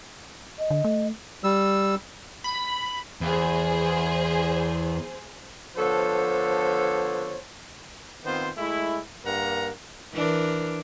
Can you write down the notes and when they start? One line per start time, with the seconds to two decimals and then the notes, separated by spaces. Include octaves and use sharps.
0.59 D#5
0.71 D3
0.84 A3
1.44 G3 E6
2.44 B5
3.21 E2 G#4 C5
5.76 D3 F3 B3 A4 C5 C#5
8.25 D#3 B3 C4 F4 C5
8.58 G#3 A3 E4
9.25 G2 A#3 A#4 F#5 A#5
10.13 E3 D4 A#4